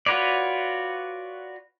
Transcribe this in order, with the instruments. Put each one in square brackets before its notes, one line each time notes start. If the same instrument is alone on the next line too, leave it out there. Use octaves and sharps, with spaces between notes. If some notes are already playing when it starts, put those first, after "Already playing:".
[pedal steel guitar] F4 F#4 B4 C#5 D5